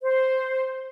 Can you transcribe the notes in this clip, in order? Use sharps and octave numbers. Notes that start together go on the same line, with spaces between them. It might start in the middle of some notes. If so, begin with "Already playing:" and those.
C5